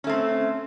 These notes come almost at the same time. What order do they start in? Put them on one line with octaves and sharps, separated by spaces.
C#4 A3 C4